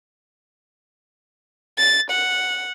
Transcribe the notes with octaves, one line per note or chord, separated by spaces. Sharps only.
A6
F#5